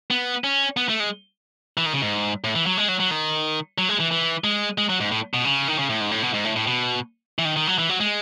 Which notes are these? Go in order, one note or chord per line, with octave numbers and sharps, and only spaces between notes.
B3
C#4
B3
A3
G#3
E3
D#3
C#3
G#2
A2
E3
F#3
G#3
F#3
F#3
D#3
F#3
G#3
E3
E3
G#3
G#3
F#3
G#2
A2
B2
C#3
D#3
C#3
A2
G#2
A2
B2
G#2
A2
A2
B2
E3
D#3
D#3
F#3
E3
F#3
G#3